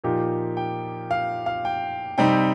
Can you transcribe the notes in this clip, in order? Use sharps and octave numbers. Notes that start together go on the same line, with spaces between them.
A#2 F3 A#3 D#4 G4
G5
F5
F5
G5
C3 G3 C4 D#4 G5